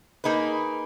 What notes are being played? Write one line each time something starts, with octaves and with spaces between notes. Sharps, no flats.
A#3 D#4 G#4 B4